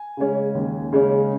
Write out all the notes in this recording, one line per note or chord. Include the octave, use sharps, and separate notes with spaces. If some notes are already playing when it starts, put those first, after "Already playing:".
Already playing: G#5
C#3 G#3 C#4
D#2
C#3 G#3 C#4